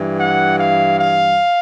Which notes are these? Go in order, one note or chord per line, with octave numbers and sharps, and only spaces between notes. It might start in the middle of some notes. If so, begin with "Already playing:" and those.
Already playing: G2 E3
F#5
F5
F5